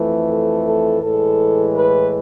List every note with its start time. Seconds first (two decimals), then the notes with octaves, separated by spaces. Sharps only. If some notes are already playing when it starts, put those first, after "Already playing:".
Already playing: F2 E3 A3
0.28 A4
0.65 A4
1.01 A2 E3 G#3 A4
1.75 B4